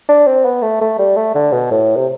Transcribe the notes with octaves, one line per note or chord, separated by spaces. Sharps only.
D4
C4
B3
A3
A3
G3
A3
D3
B2
A2
C3